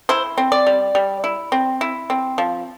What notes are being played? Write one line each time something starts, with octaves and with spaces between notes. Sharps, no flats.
E4 C5
C4
D5
G3
G3
E4
C4
E4
C4
F3